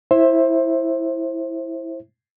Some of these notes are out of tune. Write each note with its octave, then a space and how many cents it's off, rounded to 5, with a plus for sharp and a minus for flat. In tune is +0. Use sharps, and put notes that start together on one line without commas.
E4 +0 C5 +20 E5 +0